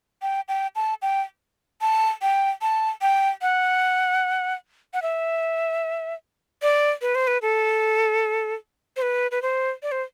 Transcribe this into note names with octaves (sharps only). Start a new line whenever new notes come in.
G5
G5
A5
G5
A5
G5
A5
G5
F#5
F#5
E5
D5
B4
C5
B4
A4
C5
B4
B4
C5
D5
C5